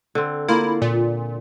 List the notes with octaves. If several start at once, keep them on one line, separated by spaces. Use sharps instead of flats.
D3 C4
A#3 E4 F4
A#2